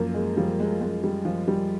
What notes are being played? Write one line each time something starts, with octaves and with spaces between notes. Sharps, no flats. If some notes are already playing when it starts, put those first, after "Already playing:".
Already playing: F#2 F3 A#3
G#3
F3 G3
G#3
F#2 G#3
G3
F3
G3